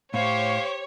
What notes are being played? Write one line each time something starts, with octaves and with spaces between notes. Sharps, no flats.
A2 G4 C5 C#5 F5